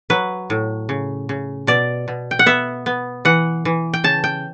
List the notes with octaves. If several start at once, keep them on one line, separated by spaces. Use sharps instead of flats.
F#3 B4
A2
C#3
C#3
B2 D5
B2
G5
F#5
B3 E5
B3
E3 F#5
E3
G5
C#3 A5
G5